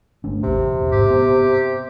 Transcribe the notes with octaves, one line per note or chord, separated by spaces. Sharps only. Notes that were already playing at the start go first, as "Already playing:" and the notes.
G1 A3 D4
E1 A1 C3
G#2 G4
B3